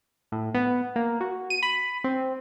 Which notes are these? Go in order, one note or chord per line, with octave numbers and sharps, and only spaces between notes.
A2
B3
A#3
F#4
D#7
B5
C4